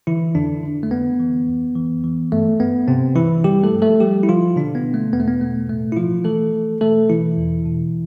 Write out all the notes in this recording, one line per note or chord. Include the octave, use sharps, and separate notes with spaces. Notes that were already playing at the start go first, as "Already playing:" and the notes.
D3 E3 E4
F2 D3 D4
D3
A3
F2 B3
E3
F2
E3
E3
G2 A3
G2 B3
G2 C3 C4
G2 E3 E4
D3 G3 G4
A3 A4
F3
A3 A4
F3 G3 G4
E4
D3 F3 F4
B2 D3 D4
B3
B2
A3
E2 B3
A3
B3
B2 A3
A2 A3
E4
E3 F3 F4
E3 A3 A4
E3
B2 A3 A4
B2 E3 E4
E2
B2